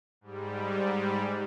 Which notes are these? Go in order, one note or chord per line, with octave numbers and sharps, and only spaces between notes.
G#2 G3